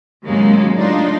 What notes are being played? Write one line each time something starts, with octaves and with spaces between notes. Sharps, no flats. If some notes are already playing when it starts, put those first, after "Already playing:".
D#2 G#2 C#3 F#3 G#3 A#3
A2 G#3 D4 D#4 F4